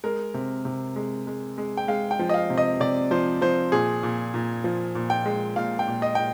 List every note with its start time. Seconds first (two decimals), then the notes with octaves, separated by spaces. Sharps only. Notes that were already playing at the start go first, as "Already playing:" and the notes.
0.04 G#3 A#4
0.34 C3
0.65 C3
0.96 G#3
1.27 G#3
1.58 G#3
1.77 G5
1.88 G#3 F5
2.11 G5
2.19 F3
2.29 D#5
2.34 F5
2.50 C3
2.58 D#5
2.80 C3 D5
3.11 F3 C5
3.41 F3 C5
3.72 A#2 G#4
4.03 A#2
4.34 A#2
4.64 F3
4.95 A#2
5.10 G5
5.26 G#3
5.56 A#2 F5
5.79 G5
5.88 A#2
6.02 D#5
6.15 A#2 G5